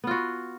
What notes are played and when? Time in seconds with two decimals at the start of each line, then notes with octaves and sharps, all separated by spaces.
0.04 B3
0.07 F4
0.11 F#4